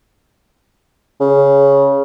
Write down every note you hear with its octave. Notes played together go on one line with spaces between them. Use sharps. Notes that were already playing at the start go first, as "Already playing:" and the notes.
C#3